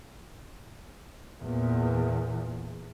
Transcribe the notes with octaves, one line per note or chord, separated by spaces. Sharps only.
E2 A#2